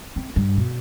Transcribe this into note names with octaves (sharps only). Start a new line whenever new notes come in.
C4
G2
B2